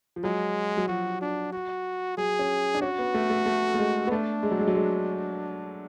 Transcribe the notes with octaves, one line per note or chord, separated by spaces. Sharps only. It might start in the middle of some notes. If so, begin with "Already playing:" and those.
F3
F#3 G#3
F#3
F3 F#4
D4
F#4
F#3 G#4
C#4
D4
C#4 F#4
B3
A3
A3
A3
A3
G#3
B3
A3 D4
G#3
F#3
G#3
F#3
G#3